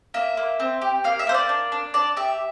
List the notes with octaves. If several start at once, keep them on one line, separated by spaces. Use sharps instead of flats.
A#3 E5
A#3
C4
G4
A#3 F5
E5
A#3 C5
D5
D4
D4
D4 D5
G4 E5